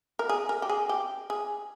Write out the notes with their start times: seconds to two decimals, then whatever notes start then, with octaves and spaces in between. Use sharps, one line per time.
0.19 A#4
0.29 G#4
0.49 A#4
0.62 G4
0.69 G#4
0.89 G4
1.30 G#4